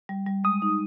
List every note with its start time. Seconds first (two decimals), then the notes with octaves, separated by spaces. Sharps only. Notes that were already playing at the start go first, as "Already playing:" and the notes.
0.09 G3
0.26 G3
0.44 G#3 D#6
0.62 D#4